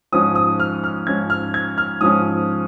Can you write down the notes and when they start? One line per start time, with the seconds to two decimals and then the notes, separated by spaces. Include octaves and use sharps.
0.12 G#2 F3 C#4 D#6
0.35 D#6
0.60 F6
0.84 F6
1.07 G#2 F3 C#4 G#6
1.30 F6
1.54 G#6
1.78 F6
2.01 G#2 F3 C#4 D#6